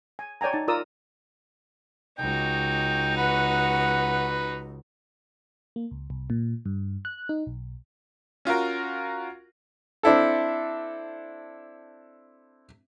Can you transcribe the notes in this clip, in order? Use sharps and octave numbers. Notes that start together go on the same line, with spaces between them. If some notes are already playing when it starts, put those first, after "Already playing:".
G#5
C#5 D5 G5 G#5 A#5
D#4 A5
F4 A#4 D5 D#6 E6
C#2 D#4 F#4 G5
B4 F#5
A#3
C#2
C2
A#2
G2
F#6
D#4
B1
C#4 F4 F#4 A#4
C4 D4 E4 A4